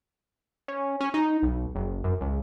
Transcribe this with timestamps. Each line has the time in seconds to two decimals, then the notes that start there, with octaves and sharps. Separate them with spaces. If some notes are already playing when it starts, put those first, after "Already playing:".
0.68 C#4
1.01 C#4
1.14 D#4
1.43 B1
1.75 F#1
2.04 F#2
2.21 C#2